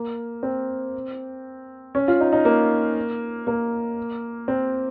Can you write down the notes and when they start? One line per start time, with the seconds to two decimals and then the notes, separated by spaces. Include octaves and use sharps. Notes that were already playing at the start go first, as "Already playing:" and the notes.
Already playing: A#3
0.43 C4
1.95 C#4
2.08 F4
2.21 D#4
2.33 D#4
2.45 A#3
3.47 A#3
4.48 C4